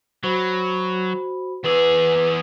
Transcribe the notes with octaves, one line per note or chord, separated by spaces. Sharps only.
F#3 F#4 C5 B5
E2 G#4 B4 D6 E6